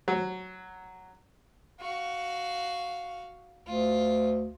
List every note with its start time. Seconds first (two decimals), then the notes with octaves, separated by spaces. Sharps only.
0.08 F#3
1.80 F#4 F5
3.67 D2 F4